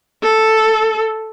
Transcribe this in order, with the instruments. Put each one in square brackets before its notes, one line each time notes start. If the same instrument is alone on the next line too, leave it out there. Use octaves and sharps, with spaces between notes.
[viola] A4